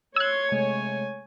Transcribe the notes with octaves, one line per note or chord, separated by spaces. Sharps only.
C#5 C6 E6 F#6 G#6
C3 G#3 A3 G#5